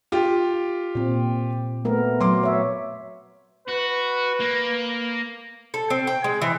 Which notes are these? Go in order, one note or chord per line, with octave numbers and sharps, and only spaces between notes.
F4 G4
A#2 C4
A3 B3 A#4
F#3 C6 D6
C#5 E5
F#4 B4
A#3
A4
C4
G5
G#3
E3